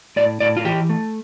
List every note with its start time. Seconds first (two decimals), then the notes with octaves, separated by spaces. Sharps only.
0.16 A2 D5
0.40 A2 D5
0.57 F4
0.64 E3 G4
0.89 A3